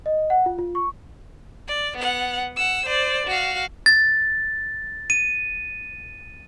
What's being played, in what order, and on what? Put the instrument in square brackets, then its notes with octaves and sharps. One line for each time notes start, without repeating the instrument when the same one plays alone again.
[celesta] D#5
F#5
F4
F4
C#6
[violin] D5
B3 F#5
F#5 E6
C5 D5
F#4 F5
[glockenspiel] A6
D#7